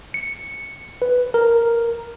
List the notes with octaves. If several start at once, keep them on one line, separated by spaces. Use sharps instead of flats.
C#7
B4
A#4